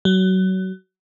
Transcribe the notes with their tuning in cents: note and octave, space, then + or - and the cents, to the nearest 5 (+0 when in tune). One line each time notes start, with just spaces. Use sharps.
F#3 +25